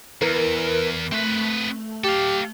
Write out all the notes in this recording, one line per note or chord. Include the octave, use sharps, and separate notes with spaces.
E2 E4 A#4 B4
A3 C4 B4
G4 A4 F5